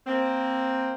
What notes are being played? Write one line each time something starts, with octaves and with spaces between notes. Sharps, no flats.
A#3 C4